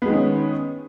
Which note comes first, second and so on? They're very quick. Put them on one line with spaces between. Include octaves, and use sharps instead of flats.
B3 G#3 D#3 C#4